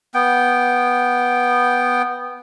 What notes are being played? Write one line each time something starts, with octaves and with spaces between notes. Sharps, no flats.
B3 G5